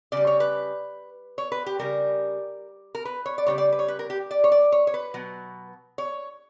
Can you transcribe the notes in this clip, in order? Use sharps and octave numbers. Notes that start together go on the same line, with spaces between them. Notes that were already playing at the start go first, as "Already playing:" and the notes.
C#3 G3 D5
C#5
B4
C#5
B4
G4
C#3 G3 A#4
A#4
B4
C#5
D5
C#3 E3 G3 C#5
D5
B4
C#5
B4
A#4
G4
D5
C#5
D5
C#5
C#5
B4
B2 F#3
C#5